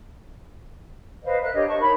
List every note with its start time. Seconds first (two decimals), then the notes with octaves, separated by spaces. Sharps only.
1.23 B4 C5 D#5 F5
1.42 A#4 E5 F#6
1.54 D4 G4 C#5 D#5
1.67 D#5 A5 C#6
1.79 D#4 A#4 C#5 B5